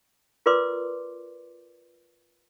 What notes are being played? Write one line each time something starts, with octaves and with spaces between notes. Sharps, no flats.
F4 A#4 B4 D5 C6 D6